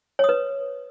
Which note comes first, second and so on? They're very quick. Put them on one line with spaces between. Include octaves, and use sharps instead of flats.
C#5 D#6 B4